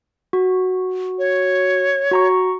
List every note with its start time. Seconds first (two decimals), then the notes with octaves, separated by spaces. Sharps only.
0.33 F#4
1.19 C#5
2.11 F#4 A#5 C#6